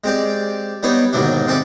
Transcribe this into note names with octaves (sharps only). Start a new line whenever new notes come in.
G#3 C4 G4 D5
G3 B3 D4 D#4 C#5
D#2 G#2 B2 D3 F#3 D4
G#3 C4 A4 D5 E5